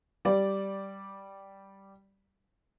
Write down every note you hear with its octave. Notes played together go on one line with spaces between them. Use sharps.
G3 D5